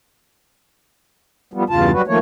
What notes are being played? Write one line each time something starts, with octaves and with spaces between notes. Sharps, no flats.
F3 G3 B3
E2 G2 C#3 F4 A5
F#3 G3 F#4 B4
D#3 F3 A3 A#3 C#5